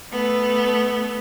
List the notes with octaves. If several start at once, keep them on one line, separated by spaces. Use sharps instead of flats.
A3 B3